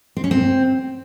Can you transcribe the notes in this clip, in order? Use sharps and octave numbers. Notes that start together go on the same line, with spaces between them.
C4
C#4
C4